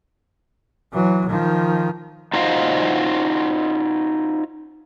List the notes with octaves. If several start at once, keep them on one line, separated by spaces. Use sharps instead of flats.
E3 F#3
D#3 F3
D#4 F4 F#4 C5 D#5 F5